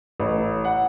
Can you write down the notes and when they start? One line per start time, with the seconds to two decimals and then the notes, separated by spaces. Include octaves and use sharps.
0.20 A1
0.65 F#5